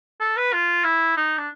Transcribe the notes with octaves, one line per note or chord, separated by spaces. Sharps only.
A4
B4
F4
E4
D#4
D4